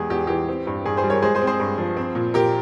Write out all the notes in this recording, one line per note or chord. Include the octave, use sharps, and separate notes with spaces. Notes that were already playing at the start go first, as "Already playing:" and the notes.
Already playing: E2 G#3 G4 G#4
E2 G4
E3 G4
C4
G2
G2 G#4
G#4 C5
G3
A#4 C#5
G#3 G#4 C5
G#4 C5
C4
G#4 C5
G2
F3
C4
A#2
A#2 G4 A#4